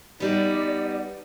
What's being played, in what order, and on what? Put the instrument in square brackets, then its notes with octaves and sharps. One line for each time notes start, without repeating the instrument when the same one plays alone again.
[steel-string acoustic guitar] G3 B3 [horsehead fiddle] D#4 [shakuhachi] D5